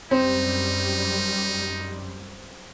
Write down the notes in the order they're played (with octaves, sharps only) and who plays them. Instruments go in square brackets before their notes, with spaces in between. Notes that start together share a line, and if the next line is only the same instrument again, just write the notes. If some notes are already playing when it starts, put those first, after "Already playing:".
[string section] F#2 G3 [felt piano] C4 [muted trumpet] D#4